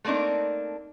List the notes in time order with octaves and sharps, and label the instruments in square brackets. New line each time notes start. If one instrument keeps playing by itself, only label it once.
[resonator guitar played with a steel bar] A3 A#3 C4 D4 D#4